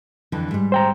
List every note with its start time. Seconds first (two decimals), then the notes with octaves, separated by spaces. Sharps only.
0.32 F2 D3 E3
0.51 G#2 G3
0.72 C5 G5 A#5